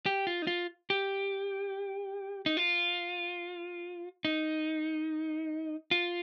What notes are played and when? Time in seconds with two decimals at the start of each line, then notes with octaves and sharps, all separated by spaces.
0.06 G4
0.27 F4
0.42 D#4
0.47 F4
0.90 G4
2.46 D#4
2.57 F4
4.25 D#4
5.91 F4